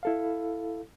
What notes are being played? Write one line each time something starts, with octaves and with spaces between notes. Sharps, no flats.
E4 A4 F5